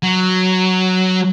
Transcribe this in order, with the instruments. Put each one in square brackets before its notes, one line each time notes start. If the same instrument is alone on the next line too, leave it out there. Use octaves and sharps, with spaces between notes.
[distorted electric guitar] F#3